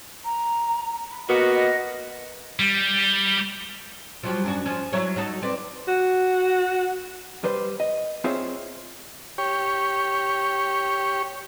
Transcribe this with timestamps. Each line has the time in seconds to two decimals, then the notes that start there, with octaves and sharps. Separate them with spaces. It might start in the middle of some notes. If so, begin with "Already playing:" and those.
0.24 A#5
1.10 B5
1.28 A#3 B3 F#4 D#5
1.54 D#5
2.59 G3
4.23 F3 F#3 G4
4.44 F#2 D4 F#4
4.65 F3 C#4
4.93 F#3 E4 C#5
5.16 D#4 F#4 A4
5.42 C4 B4 D5
5.88 F#4
7.44 G3 B4 C5
7.80 D#5
8.24 C4 F4 G#4 C5 C#5 E5
9.38 G4 C#5